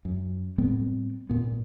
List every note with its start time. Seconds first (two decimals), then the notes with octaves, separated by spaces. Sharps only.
0.05 F#2
0.58 A2 G3 B3 C4
1.29 G#1 A#2 B3